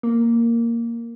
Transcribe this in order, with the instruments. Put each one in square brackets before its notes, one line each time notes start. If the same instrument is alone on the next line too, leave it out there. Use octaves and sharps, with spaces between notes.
[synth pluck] A#3